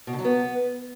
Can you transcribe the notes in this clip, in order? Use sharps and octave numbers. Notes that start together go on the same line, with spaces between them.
B2
D3
F#3
B3